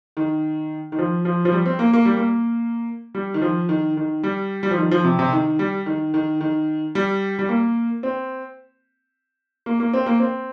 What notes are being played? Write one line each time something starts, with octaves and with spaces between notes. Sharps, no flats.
D#3
D#3
F3
F3
F3
G3
C4
A#3
A#3
G3
A#3
G3
D#3
F3
D#3
D#3
G3
G3
F3
D#3
F3
C3
C3
D#3
G3
D#3
D#3
D#3
G3
G3
A#3
C4
A#3
A#3
C4
A#3
C4